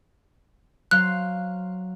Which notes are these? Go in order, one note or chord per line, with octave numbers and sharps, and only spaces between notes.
F#3 C5 F5 F#6